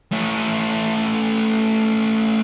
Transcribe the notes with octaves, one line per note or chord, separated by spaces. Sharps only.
A3 C#4